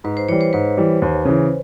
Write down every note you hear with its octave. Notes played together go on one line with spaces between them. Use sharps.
G#2 B4
C5
E3 G3 C#5
C5
G#2 B4
E3 G3
D#2
C#3 E3